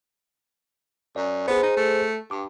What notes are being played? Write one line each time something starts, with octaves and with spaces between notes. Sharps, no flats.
F#2 D5
B3 G#4 C5
D#4
A3
G2 D6